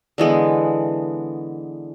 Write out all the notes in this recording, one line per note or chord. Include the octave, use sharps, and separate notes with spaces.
D3 E3 G#3 B3